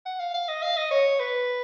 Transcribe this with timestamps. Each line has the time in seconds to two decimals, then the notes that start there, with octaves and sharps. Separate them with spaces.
0.06 F#5
0.20 F5
0.34 F5
0.48 D#5
0.62 F5
0.77 D#5
0.91 C#5
1.19 B4